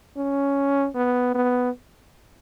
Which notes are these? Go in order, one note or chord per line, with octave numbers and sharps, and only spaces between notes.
C#4
B3
B3